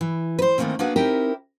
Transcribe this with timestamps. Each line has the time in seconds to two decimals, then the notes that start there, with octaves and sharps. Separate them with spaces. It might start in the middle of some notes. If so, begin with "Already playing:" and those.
0.01 E3
0.39 B4 C5
0.58 D#3 E3 F#3 A3 A#3 C4
0.79 A#3 B3 D4 F#4 G#4 B4
0.96 C4 D#4 E4 G4 A#4 G5